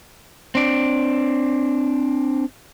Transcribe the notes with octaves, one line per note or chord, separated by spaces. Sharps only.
C4 D4